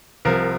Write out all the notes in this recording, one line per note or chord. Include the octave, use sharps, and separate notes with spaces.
C2 C3 F3 A#4